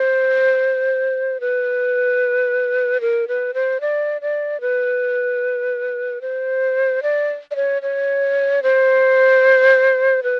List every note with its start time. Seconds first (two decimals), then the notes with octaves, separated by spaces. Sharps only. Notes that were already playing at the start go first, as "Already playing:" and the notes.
Already playing: C5
1.41 B4
3.01 A#4
3.28 B4
3.54 C5
3.81 D5
4.21 D5
4.61 B4
6.21 C5
7.03 D5
7.51 D5
7.56 C#5
7.82 C#5
8.63 C5
10.24 B4